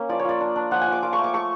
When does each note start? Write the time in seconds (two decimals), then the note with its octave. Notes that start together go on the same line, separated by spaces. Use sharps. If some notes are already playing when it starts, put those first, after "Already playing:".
Already playing: A#3 C#4
0.09 F3 D5
0.19 C#5
0.25 F4 D5
0.41 D4
0.56 D4
0.71 F3 F#5
0.82 G#5
0.87 F3
0.92 D6
1.02 F4 D6
1.13 C#6
1.18 A3
1.24 D6
1.34 A3 C#6